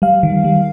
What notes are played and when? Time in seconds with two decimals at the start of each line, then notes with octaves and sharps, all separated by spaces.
0.02 G3 F5
0.23 D#3
0.44 G3